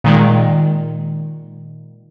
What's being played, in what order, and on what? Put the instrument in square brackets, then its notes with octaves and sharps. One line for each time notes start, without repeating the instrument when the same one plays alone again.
[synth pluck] A#2 D#3 G#3